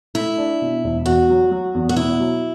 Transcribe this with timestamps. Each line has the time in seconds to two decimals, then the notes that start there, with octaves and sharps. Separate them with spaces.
0.15 A3 E4
0.37 D4
0.61 B2
0.84 E1
1.06 E2 F#4
1.29 F#3
1.51 F#3
1.75 E2
1.89 F#4
1.96 B2 E4
2.19 F#3